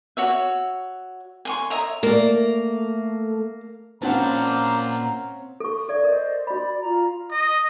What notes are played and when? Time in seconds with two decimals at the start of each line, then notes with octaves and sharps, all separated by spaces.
0.17 F#4 C#5 E5
1.45 G#5 C6 C#6
1.70 C#5 D#5 E5 A#5
2.03 A3 A#3 A#4 D5
4.02 A#2 C4 C#4 C5 F5 F#5 A5 A#5
5.60 A4 C#6
5.89 A4 D5 E5
6.04 A#4 C5 D5 D#5
6.47 F#4 D5 B5
6.82 F4 A#5
7.31 D#5